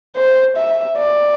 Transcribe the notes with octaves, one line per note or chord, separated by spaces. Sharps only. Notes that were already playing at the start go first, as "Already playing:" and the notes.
C5
E5
D5